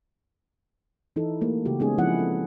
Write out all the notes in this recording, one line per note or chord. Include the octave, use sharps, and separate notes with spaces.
E3 D#4 E4 A4
A3 A#3 G4
C#3 G#3 F#4 G4
G#3 B3 C#4 D#4 G#4
F3 C4 D4 E4 F#5
C4 A4